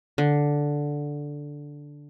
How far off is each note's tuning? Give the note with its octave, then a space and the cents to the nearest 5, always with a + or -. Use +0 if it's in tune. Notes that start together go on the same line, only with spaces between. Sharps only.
D3 -5